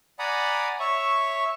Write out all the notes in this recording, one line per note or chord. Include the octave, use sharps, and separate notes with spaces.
D5 F#5 G#5 A#5 B5 D#6
C#5 E5 C#6